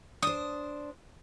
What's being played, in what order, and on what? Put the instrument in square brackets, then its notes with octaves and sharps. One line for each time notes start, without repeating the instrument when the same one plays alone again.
[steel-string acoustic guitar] D4 C5 [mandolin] D#6